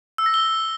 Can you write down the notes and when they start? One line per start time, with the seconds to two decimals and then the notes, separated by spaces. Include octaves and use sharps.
0.18 E6
0.26 A#6
0.34 G7